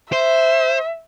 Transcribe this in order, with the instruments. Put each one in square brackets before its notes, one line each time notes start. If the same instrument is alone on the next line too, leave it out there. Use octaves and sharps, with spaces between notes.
[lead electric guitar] C5 [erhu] E5